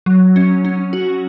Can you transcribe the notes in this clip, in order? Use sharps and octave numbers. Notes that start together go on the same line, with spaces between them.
F#3
C#4
C#4
F#4